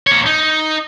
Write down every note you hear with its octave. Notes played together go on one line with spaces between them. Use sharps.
A#3 C#5
D#4